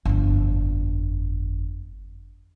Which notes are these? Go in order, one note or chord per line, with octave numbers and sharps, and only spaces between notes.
G1 F2